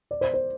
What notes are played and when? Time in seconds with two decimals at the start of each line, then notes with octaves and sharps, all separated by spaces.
0.11 D5
0.21 C5
0.34 C5